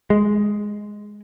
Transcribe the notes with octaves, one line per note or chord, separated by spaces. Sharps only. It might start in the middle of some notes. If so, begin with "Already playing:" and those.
G#3